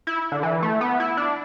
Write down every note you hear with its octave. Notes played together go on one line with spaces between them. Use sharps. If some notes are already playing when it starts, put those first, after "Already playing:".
E4
D3
E3
A3
B3
E4
D4